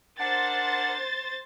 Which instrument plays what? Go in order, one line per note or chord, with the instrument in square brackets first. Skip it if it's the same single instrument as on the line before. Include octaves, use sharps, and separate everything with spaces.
[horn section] D4 A#4 F#5 [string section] C5 A6